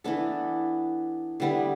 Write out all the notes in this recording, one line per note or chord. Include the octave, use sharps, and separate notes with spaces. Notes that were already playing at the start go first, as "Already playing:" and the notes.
E3 B3 D4 A4
D3 G3 B3 E4